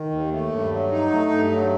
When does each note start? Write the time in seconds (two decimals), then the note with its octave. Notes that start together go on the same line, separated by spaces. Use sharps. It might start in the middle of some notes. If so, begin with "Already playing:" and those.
Already playing: D#3
0.11 D#2
0.32 A3
0.51 G2
0.71 F#3
0.92 D#4
1.11 A3
1.31 G2
1.51 F#3